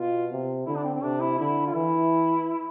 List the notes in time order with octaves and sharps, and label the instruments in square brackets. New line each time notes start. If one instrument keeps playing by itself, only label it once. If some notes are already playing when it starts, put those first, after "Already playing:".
Already playing: [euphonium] B2 [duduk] F4
[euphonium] C3
[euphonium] D3 [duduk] E4
[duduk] D4
C4
C4
[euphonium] C3 [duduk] D4
[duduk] E4
[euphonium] D3 [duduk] E4
[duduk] F4
[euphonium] E3 [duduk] E4